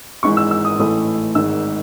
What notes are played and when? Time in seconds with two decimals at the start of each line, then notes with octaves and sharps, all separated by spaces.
0.23 G#1 G#2 E3 C#6
0.37 E6
0.51 E6
0.65 D#6
0.79 A1 A2 E3 A3 D#6
1.35 G#1 G#2 D#3 E6